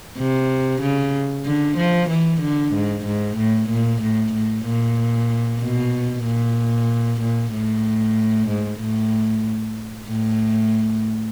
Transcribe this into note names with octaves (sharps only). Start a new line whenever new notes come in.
C3
C#3
D3
F3
E3
D3
G#2
G#2
A2
A#2
A2
A2
A#2
B2
A#2
A#2
A2
G#2
A2
A2